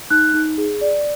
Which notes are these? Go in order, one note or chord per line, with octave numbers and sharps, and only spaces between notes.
D#4 F#6
D#4
G#4
D5